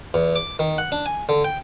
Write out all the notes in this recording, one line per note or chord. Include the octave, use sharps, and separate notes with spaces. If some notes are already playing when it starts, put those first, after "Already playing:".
E2
D6
D#3
F#5
D4
G#5
D3
G5